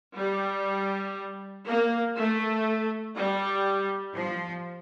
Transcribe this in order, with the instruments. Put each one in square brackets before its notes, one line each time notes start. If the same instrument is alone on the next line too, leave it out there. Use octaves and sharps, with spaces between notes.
[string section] G3
A#3
A3
G3
F3